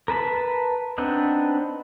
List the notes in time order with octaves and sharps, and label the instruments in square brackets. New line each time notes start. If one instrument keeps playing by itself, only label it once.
[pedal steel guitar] A#4 B4 A5 B5
B3 C4 D4 D#4 B4